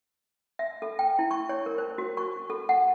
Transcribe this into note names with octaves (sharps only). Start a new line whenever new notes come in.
E5
A4
G5
E4
C#6
C#5
A#4
C5
F#4
C#6
A4
F#5